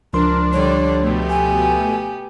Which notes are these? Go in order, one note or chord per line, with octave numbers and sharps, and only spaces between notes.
C#2 F3 D4 A#4 C6
D3 G3 C#5 D5
B2 A3 B3 G4
G#5